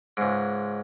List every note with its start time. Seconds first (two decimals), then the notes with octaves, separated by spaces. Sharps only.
0.17 C#2 G#2